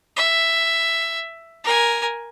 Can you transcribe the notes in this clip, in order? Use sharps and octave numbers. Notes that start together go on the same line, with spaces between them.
E5
A#4 G#5